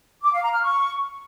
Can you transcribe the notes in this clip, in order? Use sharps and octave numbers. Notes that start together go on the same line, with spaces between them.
D6
F5
A#5
F6
C#6